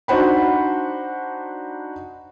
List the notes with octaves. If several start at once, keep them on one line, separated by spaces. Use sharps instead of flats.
D4 D#4 F#4 C5 F#5 B5